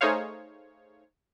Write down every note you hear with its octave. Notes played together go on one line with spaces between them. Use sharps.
A3 D#4 G#4 C5 C#5 F5